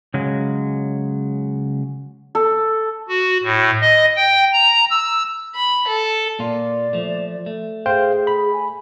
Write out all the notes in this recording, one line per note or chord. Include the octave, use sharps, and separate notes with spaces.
C#3 F#3 G#3
A4
F#4
A2
D#5
G5
A#5
E6
B5
A4
A#2 A#3 F4 D5
F3 A3
A3
G#4 C5 F5 G5
B5
G#5